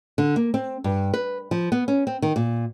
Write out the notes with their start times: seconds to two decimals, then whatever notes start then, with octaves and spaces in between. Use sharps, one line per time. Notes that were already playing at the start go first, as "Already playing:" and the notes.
0.18 D3
0.36 A#3
0.54 C4
0.84 G2
1.14 B4
1.51 F3
1.72 B3
1.88 C#4
2.07 C4
2.22 D#3
2.36 A#2